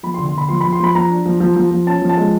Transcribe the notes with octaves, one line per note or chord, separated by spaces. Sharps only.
F3 B5
C6
D3
C6
D3 B5
F3 C6
F3 B5
C6
F3 B5
F3 A#5
D4
F3
F3
F3
F3
C#4 A5
F3
A5
G#3